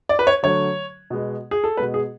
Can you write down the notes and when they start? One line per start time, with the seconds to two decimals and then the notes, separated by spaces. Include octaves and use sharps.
0.09 D5
0.19 B4
0.27 C#5
0.43 D3 F#3 A3 C#5
1.10 B2 G#3 B3
1.51 G#4
1.64 A4
1.77 B2 G#3 B3 B4
1.94 G#4